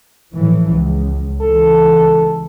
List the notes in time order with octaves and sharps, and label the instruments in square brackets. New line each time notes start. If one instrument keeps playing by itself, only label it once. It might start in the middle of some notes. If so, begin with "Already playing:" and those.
[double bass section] A2 E3 F3
C#2
[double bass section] C#2 E3 [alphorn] A4